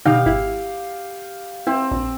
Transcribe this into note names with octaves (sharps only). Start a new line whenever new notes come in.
B2 D3 D#4 G4 F5
G#1 E4
C4 E4
A#1